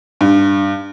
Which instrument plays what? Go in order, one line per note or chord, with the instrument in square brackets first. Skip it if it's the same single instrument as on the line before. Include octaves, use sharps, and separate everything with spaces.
[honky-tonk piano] G2